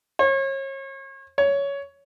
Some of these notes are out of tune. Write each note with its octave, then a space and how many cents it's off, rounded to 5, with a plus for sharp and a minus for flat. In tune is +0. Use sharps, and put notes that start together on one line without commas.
C#5 -35
C#5 +15